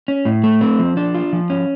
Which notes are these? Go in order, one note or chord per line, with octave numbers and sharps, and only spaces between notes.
C#4
A2
A3
C4
F3
D4
F4
F3
C#4